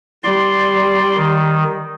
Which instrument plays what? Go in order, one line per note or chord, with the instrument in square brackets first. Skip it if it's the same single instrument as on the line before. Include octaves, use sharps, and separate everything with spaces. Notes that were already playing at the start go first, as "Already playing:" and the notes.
[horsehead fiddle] G3 [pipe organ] D5 C6
[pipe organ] D#3